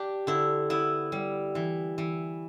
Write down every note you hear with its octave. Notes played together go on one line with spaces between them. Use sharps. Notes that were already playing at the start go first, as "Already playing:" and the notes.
Already playing: D4 G4
D3 E4
B3 E4
G3
E3
E3